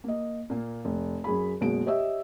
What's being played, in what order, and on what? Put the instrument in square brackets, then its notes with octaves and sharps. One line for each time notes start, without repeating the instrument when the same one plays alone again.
[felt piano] A#3 D#5
A#2 A#3
F1
F#2 G#4 B5
F#1 B2 G#3 D7
G4 C#5 D#5 E5 E6